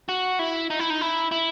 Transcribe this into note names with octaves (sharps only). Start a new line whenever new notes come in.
F#4
E4
D#4
E4
D#4
E4
E4